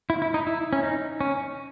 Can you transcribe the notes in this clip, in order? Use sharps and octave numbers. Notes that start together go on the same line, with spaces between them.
E4
E4
D#4
E4
C#4
D#4
C#4